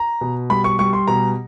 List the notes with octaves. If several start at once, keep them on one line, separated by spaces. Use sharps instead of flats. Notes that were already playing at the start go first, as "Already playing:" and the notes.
Already playing: A#5
B2
G3 B5
C#6
G3 C#6
C6
B2 A#5